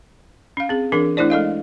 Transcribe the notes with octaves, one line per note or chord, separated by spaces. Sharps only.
C#4 F5
C4 G#4
E3 D4 G#4 A#4
A3 D4 E4 C5 D5
G#3 A4 D#5 F5